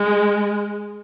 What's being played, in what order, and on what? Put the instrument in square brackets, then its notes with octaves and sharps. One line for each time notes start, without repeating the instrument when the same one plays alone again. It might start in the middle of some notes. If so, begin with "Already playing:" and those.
Already playing: [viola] G#3